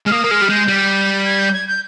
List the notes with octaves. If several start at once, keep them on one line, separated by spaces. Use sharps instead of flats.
G#3 F6
A#3 D#6
A#3
G#3 F6
G3
G#3 G6
G3
G#6
G6
G#6
G6